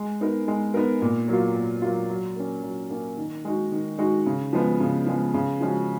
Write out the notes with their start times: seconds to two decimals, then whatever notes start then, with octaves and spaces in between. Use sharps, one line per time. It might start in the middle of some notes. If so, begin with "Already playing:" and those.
Already playing: G#3
0.21 B3 D#4 A#4
0.48 G#3
0.74 B3 D#4 A#4
1.02 A#2
1.28 F#3 A#3 F4
1.56 A#2
1.82 F#3 A#3 F4
2.10 F#3
2.36 A#3 C#4
2.63 F#3
2.90 A#3 C#4
3.17 D#3
3.45 G#3 D#4 F#4
3.72 D#3
3.98 G#3 D#4 F#4
4.26 C#3
4.53 F3 G#3 B3
4.80 C#3
5.06 F3 G#3 B3
5.34 C#3
5.61 F3 G#3 C#4 F#4